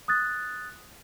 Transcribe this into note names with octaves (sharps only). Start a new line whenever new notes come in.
D#6 F#6 A6